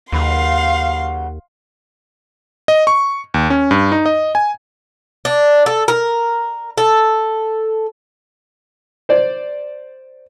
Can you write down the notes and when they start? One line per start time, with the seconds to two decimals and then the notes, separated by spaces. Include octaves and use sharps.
0.12 D#2 C#3 F#3 B4 F5 C6
2.68 D#5
2.87 C#6
3.34 D#2
3.50 C#4
3.71 G2
3.92 D#4
4.06 D#5
4.35 G#5
5.25 D4
5.66 A4
5.88 A#4
6.77 A4
9.09 C5 D5